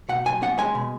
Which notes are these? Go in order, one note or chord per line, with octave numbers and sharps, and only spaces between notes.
B2 F#5
B1 G#5
C#4 F#5
G#3 G#5
B2